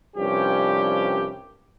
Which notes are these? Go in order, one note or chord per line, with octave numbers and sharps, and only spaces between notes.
C2 G2 F3 C#4 G4